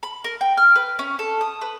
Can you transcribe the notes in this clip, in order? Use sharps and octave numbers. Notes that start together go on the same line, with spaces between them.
B5
A#4
G5
F6
B4
C#4
A4
D#6
B4